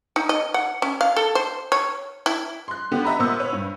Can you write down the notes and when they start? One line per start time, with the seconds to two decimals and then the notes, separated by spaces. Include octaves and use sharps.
0.16 D#4
0.29 D#5
0.54 F#5
0.82 C#4
1.01 F5
1.16 A4
1.35 C5
1.72 C#5
2.26 E4
2.68 C6 F#6
2.91 D3 B3 G4
3.04 D#5 E5 A#5 B5
3.19 A#2 B3 C5 E6
3.39 B4 C#5
3.53 G2